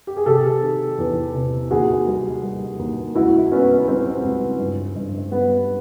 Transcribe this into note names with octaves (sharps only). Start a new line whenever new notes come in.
G4
G#4
C3 G4 A4
D#3
E2
C3
D#2 F#4 G#4
G3
G3
D#2
C#2 E4 F#4
C#2 B3 C#4
G3 C4
C#2
G2
G2
G3 B3